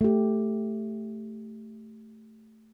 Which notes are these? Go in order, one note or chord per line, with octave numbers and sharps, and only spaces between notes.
A3 G4